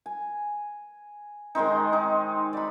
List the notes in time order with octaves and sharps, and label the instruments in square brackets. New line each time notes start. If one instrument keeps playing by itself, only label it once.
[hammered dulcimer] G#5
D#3 G#3 C4 D#4
D#4
D5 B5